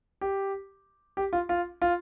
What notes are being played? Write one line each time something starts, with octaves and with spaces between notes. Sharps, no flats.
G4
G4
F4
F4
F4